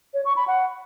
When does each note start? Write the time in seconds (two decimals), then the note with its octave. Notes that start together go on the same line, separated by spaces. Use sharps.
0.14 C#5
0.25 C#6
0.36 B5
0.48 F#5